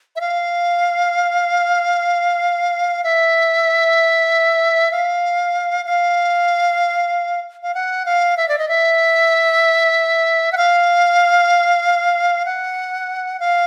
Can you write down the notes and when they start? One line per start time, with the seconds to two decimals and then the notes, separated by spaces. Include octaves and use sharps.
0.16 E5
0.21 F5
3.04 E5
4.91 F5
5.86 F5
7.63 F5
7.74 F#5
8.05 F5
8.37 E5
8.48 D5
8.58 D#5
8.68 E5
10.52 F#5
10.57 F5
12.45 F#5
13.40 F5